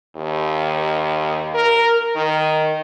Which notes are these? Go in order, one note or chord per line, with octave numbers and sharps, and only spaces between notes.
D#2
A#4
D#3